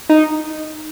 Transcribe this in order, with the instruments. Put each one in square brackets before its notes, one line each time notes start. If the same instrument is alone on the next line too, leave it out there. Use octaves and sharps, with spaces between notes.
[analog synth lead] D#4